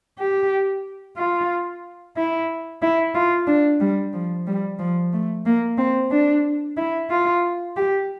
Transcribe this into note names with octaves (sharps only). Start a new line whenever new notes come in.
G4
F4
E4
E4
F4
D4
G3
F3
G3
F3
A3
A#3
C4
D4
E4
F4
G4